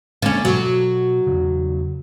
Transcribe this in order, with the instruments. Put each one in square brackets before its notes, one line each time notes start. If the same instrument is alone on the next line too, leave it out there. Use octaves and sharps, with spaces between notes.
[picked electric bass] D1 G#3 A#3 [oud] D3 C#4
[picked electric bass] B2 [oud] F#3
[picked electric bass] E2 C#3